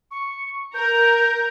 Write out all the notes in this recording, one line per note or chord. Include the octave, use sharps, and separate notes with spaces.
C#6
A#4 G6